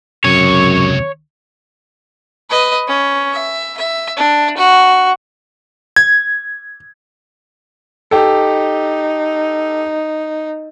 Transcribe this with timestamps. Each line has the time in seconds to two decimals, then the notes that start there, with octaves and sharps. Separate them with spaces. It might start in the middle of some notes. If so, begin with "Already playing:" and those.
0.25 C#2 F#2 C3 C#5
2.50 B4 D#5
2.88 C#4
3.32 E5
3.77 E5
4.17 D4
4.57 F#4
5.96 G#6
8.11 D#4 G4 A4